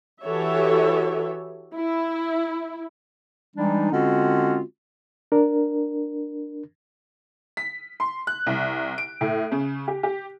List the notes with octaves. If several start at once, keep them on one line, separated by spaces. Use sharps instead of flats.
E3 F#4 G4 A4 C#5 E5
E4
E3 G3 G#3 D4 D#4
D3 G#3 C4 C#4 F4 F#4
D4 A#4
B6
C6
F#6
C2
D7
A2
C#3
G4
G4